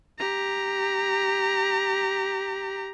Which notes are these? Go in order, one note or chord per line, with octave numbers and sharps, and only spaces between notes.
G4 A#5